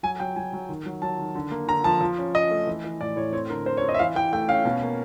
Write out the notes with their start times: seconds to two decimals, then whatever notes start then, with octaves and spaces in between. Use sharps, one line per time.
0.03 F#3 G#5
0.20 F#3 G5
0.36 F#3 G#5
0.53 F#3
0.69 D#3
0.86 F#3
1.02 F#3 A5
1.19 D#3
1.35 D3
1.51 A#3
1.68 D3 A#5
1.84 F3 A5
2.01 F3
2.18 C#4
2.34 C#4 D#5
2.51 A3
2.67 E3
2.84 E3
3.01 A2 D5
3.16 A2 C#5
3.33 C4 C#5
3.50 D3 A#4
3.66 C4 C5
3.77 C#5
3.82 C4
3.89 D#5
3.94 E5
3.99 E3 F5
4.15 E3 G5
4.32 A3 G5
4.48 C#4 F5
4.65 B2
4.82 A#3